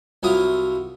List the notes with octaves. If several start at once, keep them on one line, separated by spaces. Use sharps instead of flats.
C2 F#3 E4 F4 D#6